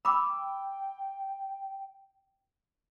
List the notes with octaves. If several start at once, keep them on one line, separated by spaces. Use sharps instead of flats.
G5 B5 D6 E6